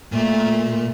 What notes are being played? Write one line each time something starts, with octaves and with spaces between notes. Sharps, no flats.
A#2 A3